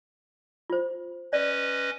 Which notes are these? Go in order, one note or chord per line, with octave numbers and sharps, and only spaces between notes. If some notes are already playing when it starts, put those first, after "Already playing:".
F4 C5
C#4 B4 D5 D#5